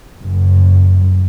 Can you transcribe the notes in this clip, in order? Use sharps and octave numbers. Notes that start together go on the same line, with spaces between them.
F#1 F#2